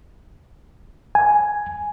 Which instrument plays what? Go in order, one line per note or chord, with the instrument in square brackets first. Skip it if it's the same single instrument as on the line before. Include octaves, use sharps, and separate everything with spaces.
[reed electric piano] G#5